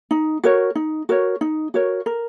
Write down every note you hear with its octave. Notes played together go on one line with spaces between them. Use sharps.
D#4
F#4 A#4 C#5
D#4
F#4 A#4 C#5
D#4
F#4 A#4 C#5
A#4